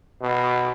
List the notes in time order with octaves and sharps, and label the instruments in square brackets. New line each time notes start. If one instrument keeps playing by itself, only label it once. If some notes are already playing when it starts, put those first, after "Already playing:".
[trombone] B2